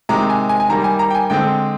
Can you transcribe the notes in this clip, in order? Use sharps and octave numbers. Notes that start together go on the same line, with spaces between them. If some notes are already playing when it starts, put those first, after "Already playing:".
C3 D#3 G#3 A#5
G#5
G#5
G#5
D#3 G3 A#3 A#5
G#5
A#5
G5
G#5
D3 G#3 C4 G5